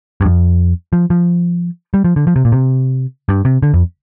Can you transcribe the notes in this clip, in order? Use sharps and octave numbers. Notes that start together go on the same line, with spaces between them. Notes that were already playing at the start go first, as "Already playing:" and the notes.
G2
F2
F3
F3
G3
F3
D3
F3
C3
A#2
C3
G2
C3
D3
F2